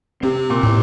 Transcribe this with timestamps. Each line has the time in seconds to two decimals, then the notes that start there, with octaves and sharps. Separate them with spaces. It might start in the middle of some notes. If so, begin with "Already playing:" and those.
0.23 C3 C4
0.50 A#2
0.63 A2